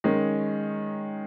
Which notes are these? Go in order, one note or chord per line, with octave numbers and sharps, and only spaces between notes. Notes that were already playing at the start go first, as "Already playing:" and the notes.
D#3 G#3 C#4